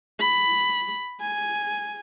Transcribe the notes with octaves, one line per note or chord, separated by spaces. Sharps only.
B5
G#5